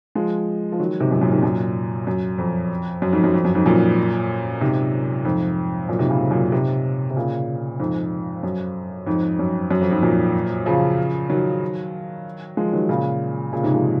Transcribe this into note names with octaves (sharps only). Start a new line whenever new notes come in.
F3 G#3
F3
D#3 F#3
G#2 C3
F#2 A#2
F#2 A#2
G#2 C3
F#2 A#2
F#2
F2
F#2
F2 G#2
F#2
F2
F#2
F2 G#2
F#2 A#2
G#2 C3
F2 G#2
F#2 A#2
G#2 C3
A#2 C#3
F#2 A#2
G#2 C3
C3
A#2 C#3
F2 G#2
F#2
F2 G#2
F#2
F#2
F2
F2 G#2
F#2 A#2
C#3 F3
D#3 F#3
F3 G#3
D#3 F#3
A#2 C#3
A#2 C#3
G#2 C3
F3 G#3